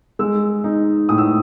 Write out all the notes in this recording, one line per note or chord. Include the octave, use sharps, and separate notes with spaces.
G#3 E6
D#4
A2 D#6
E6